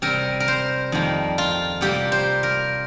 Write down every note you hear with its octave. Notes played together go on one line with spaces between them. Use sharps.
C3 G3 C4 A#4
A#4
C5
F2 D#3 G3 A#3
F4
C3 G3 A#3 G4
C5
A#4